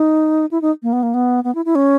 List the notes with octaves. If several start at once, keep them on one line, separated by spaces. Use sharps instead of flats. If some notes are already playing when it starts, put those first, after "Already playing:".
Already playing: D#4
E4
D#4
A#3
B3
A#3
B3
B3
E4
E4
C#4